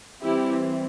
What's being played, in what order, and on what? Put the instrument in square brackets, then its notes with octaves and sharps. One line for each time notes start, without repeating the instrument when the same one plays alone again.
[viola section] E3 G3 C4 E4 G4